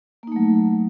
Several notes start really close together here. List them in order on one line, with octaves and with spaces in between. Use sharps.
A#3 D#4 A3 F#3